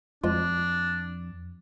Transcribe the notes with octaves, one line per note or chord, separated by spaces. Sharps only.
F2 F3 G#3 D4 F4